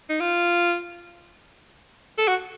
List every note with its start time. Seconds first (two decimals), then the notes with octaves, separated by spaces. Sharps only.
0.09 D#4
0.20 F4
2.18 A4
2.27 F#4